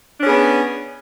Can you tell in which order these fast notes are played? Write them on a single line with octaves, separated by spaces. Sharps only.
D4 C#4 G#4 B3